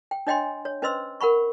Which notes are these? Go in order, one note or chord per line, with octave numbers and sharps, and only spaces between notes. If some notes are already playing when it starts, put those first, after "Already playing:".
G5
D4 C#5 D#5 G5 G#5 C6
C#5
C#4 B4 C5 D#5 C6 E6
A#4 F#5 B5 C#6